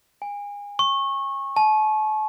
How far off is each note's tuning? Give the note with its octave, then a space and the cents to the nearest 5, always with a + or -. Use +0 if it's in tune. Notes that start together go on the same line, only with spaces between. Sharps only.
G#5 -30
C#6 -20
A5 -40